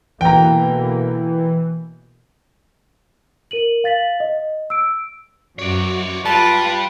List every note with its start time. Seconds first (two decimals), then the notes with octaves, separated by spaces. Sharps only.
0.21 B2 D3 E3 A#3 G5 A#5
3.51 A#4 D#7 F#7
3.84 F5 A6 B6 F#7
4.20 D#5
4.70 E6 D7
5.59 F#2 F#4 C#5 D5
6.25 G3 F4 B4 A5